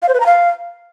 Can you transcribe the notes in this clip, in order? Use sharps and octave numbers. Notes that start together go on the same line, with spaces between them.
F5
C5
B4
A#5
F5